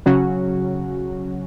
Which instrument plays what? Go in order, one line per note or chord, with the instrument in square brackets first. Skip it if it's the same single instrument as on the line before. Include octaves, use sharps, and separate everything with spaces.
[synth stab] C#3 F#3 C#4 F#4